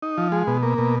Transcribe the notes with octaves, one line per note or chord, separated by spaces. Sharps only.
D#4
F3
G#3
B2
A#3
B2